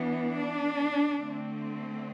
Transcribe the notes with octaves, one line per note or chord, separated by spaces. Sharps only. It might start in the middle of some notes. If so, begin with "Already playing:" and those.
Already playing: E3 B3 D4
D4
D3 A3 C4